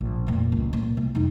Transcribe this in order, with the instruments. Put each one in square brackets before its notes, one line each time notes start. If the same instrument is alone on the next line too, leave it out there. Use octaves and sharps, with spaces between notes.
[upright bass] A#1
F1 A#2
C#2
A#2
C2
F1 D#4